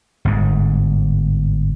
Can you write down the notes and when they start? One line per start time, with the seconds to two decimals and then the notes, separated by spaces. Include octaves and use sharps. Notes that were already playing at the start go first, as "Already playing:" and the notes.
0.25 G1 G#2